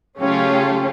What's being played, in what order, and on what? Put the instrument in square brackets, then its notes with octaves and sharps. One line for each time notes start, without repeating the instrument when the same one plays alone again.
[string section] C#3 F#3 A3 C#4 F4 G4